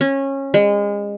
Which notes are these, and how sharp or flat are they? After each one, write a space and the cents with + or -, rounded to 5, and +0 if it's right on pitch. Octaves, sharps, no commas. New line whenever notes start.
C#4 -20
G#3 -30